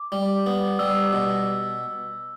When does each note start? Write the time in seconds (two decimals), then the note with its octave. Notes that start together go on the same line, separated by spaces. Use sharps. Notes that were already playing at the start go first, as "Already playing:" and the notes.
Already playing: D6
0.12 G3
0.46 B3
0.79 G3 E6
1.13 B2